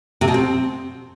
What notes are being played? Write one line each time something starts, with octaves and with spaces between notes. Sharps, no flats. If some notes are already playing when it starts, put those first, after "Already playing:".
C3
B2
C4